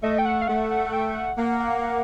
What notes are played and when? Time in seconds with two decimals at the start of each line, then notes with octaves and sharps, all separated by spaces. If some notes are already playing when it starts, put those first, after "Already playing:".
0.03 A3 D#5
0.18 G5
0.25 F#5
0.42 F5
0.47 A3 F#5
0.71 F#5
0.86 F#5
0.93 G5
1.15 F#5
1.37 A#3 F#5
1.60 F#5
1.82 F#5